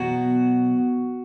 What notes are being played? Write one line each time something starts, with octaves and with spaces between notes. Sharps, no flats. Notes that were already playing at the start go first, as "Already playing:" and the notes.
Already playing: B2 F#3 F#4